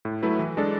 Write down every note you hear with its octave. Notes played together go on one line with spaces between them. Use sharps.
A2
F#3 A3 E4 B4
E3
G#3 D4 A4 D5